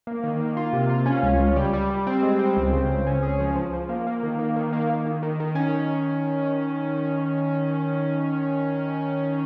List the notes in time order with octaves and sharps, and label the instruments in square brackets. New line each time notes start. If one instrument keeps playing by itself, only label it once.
[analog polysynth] A#3
D#3
A#3
F4
C3
F4
C#4
C#2
C#2
G3
G3
G3
C4
G#3
C4
C#2
C#3
C#2
C#4
G#4
F3
F3
F3
A#3
A#3
D#3
A#3
D#3
A#3
A#3
D#3
D#3
D#3
C#4